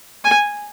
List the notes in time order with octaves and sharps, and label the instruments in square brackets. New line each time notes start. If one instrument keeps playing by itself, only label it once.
[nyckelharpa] G#5